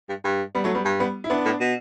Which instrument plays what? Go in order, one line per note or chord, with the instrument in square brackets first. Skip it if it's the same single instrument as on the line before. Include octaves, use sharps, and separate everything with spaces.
[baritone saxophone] G2
G2
[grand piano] G3 B3
F#3 A3
G3 B3
[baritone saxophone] G2
[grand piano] G3 B3
E4
B3 D4
[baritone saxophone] A2
B2